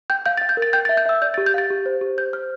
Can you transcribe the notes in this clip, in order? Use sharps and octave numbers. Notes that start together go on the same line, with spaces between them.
G5 G6
F5 G6
F5 A6
G6
A#4
A6
G5 G6
E5 A6
G6
E5 E6
D5 G6
G4 A6
G6
F5 A6
G4
C5
G4
C5 G6
C5 F6